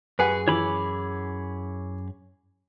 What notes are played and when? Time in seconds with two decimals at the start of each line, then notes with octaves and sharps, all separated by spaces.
0.19 F#2 G#4 B4 F#5 G#5
0.48 E3 C#5 B5 D6